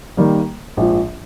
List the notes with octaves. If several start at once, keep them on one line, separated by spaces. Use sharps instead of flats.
D#3 G3 A#3
A#1 G#2 F3